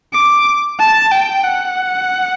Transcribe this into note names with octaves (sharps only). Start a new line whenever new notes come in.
D6
A5
G5
F#5